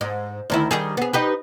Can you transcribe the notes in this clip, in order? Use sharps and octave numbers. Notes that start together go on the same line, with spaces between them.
G#2
D2 D#3 E4
D#3 G3 G#4
B3 G#4
D#4 G4 B4